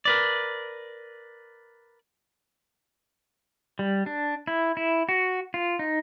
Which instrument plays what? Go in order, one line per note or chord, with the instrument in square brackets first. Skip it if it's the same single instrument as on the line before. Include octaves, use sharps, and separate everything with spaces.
[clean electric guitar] A#4 B4 D5
[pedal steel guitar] G3
D4
E4
E4
F#4
F4
D#4